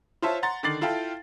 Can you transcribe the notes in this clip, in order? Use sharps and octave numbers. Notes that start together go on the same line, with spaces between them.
F4 C5 C#5 E5 A5 E6
F#5 A#5 C6 A6
D3 D#3 D6 A6 C7 F#7
E4 F4 A4 F5 G5